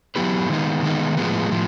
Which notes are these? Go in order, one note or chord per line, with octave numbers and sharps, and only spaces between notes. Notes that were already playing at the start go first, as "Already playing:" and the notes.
F#3 B3 E4 G4 B4
D#3 G#3 B3 D#4
D#3 G#3 B3 D#4
A2 F3 G#3 B3
A2 F3